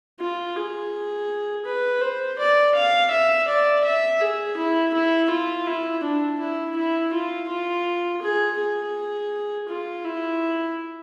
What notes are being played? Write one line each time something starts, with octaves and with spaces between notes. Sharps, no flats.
F4
G#4
B4
C5
D5
F5
E5
D5
E5
G#4
E4
E4
F4
E4
D4
E4
E4
F4
F4
G#4
G#4
F4
E4